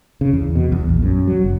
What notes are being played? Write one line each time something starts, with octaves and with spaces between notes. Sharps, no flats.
C#3
E2
B2
E2
A#1
F#2
F#3
F#1